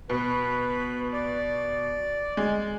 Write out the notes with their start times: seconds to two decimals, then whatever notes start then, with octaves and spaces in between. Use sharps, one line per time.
0.10 B2 B4
1.13 D5
2.37 G#3